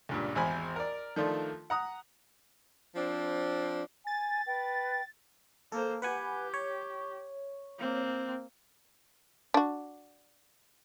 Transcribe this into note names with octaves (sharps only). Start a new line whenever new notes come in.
C#2 G2 A#2
G#1 E2 C5 G#5 B5
A#4 D5
D#3 F3 A3 D4 F4
F#5 A#5 D#6
F3 C4 D4
G#5 A6
B4 G5
A#3 A4 C5
G4 B4 F#5 G#5
C#5
A#3 C4
D4 F#4